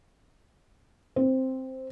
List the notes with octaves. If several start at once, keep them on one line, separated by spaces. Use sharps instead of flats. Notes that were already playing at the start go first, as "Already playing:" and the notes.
C4